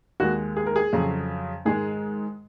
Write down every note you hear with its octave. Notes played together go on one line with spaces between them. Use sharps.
D#2 D#3 G#3 F#4
G#4
A#4
G#4
F2 C#3 F#3
G#2 D#3 G#3 G#4